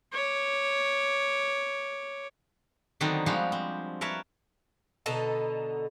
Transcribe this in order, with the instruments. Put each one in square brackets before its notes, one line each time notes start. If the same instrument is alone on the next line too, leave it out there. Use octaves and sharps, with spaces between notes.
[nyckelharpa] C#5 D6
[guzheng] D3 D#3 F#3 B3 C4 D4
F3 G3 G#3 F#4 G4 F5
C4
A#4 B4 C#5 E5 A5
[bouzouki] B2 D3 D#4 A4